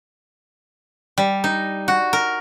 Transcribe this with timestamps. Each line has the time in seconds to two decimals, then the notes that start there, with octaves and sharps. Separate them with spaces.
1.18 G3
1.44 D#4
1.88 F#4
2.13 A#4